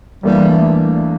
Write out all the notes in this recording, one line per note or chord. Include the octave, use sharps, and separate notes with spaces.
E2 E3 G3 A#3 D4 A4
A3